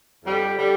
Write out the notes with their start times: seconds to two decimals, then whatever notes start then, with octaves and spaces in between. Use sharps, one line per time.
0.24 F2 D3 G3
0.58 D3 G3